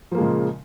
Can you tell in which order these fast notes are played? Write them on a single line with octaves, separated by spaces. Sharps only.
F3 A#3 G#3 C#3 A#2